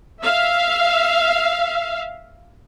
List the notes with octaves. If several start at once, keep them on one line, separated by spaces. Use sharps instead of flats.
E5 F5